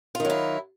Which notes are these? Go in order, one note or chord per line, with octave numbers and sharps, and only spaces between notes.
D#3 F#3 E4 F4